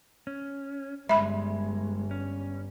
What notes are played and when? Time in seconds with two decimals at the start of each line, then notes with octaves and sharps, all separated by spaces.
0.27 C#4
1.09 G1 G#3 E5 B5
2.11 C#4